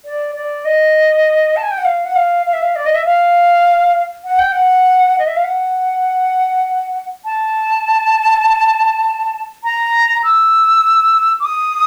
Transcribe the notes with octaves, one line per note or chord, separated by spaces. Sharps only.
D5
D5
D#5
A5
G#5
G5
F#5
F5
F#5
F5
F5
E5
F5
D5
D#5
E5
F5
F#5
G5
F#5
D#5
E5
F5
F#5
A5
A#5
E6
D6
D#6